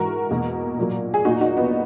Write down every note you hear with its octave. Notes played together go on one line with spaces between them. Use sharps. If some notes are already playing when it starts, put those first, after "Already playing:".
Already playing: G#2 E3 G#3 F#4 A#4
E2 B2 A#3
A#2 F#3 A#3
G#4
A#2 A#3 D#4 F#4
D#4 F#4
B3 D#4